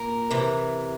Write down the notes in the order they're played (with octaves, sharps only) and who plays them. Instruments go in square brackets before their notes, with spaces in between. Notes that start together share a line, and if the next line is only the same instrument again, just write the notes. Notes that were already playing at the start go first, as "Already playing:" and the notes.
Already playing: [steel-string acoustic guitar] A#2 A#4
C3 E3